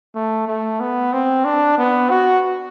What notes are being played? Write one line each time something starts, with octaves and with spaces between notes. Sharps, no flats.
A3
A3
B3
C4
D4
B3
F#4